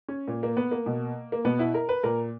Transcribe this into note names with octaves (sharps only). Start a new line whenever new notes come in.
C#4
A#2
A#3
B3
A#3
B2
A#3
B2 B3
E4
A#4
B4
A#2 A#4